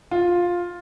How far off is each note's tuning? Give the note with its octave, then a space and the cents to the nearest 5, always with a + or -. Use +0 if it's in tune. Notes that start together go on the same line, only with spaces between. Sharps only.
F4 +10